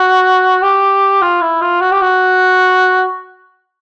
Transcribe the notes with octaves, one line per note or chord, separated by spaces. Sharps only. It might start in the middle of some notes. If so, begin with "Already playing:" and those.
Already playing: F#4
G4
F4
E4
F4
F#4
G4
F#4